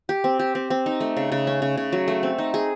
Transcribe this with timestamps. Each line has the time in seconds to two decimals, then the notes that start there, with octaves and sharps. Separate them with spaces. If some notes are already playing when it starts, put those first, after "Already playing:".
0.09 G4
0.24 C4
0.39 G4
0.55 C4
0.70 C4
0.86 D#4
1.00 A3
1.17 C#3
1.32 C#3
1.47 C#4
1.62 C#3
1.77 C#3
1.92 F#3
2.08 A3
2.23 C4
2.38 D#4
2.54 G#4